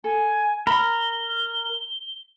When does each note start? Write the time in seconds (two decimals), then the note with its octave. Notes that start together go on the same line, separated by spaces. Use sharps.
0.04 A4 G#5
0.67 A#4 B5 G7